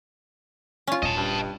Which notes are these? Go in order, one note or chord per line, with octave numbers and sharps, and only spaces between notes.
C#4 F4
D#1 D#5 A5
G2